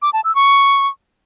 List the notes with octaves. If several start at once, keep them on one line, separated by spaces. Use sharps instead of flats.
D6
A5
E6
C#6